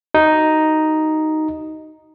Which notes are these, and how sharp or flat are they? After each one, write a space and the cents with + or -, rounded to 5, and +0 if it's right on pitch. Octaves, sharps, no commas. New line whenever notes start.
D#4 +0 F#4 +30